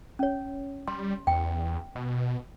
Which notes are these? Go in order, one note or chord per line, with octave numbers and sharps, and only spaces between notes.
C#4 C#5
G3 C6
E2 G5
B2